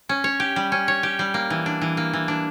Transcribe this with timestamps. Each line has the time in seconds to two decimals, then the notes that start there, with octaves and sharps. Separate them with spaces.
0.09 C#4
0.24 C#5
0.40 G4
0.56 G3
0.72 C#4
0.88 C#5
1.03 G4
1.19 G3
1.34 A#3
1.50 E3
1.66 D4
1.81 E3
1.97 A#3
2.13 E3
2.28 D4